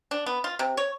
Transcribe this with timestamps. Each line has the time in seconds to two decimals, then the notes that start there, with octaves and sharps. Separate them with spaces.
0.11 D4
0.26 B3
0.44 F4
0.59 C3
0.77 C#5